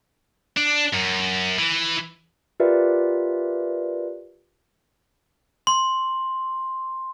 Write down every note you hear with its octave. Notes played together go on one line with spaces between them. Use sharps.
D4
F#2
E3
F4 G4 A#4 B4 D5 E5
C6